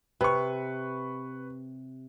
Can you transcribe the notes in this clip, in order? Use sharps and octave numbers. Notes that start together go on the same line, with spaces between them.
C3 B4 C#6